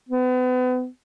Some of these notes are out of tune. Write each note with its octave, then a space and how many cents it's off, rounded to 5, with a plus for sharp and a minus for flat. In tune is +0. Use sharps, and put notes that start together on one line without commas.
B3 +35